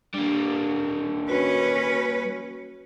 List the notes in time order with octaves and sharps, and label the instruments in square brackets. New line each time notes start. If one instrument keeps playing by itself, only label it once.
[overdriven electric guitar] G3 A#3 [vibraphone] D4
[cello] C#4 B4 [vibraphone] F#4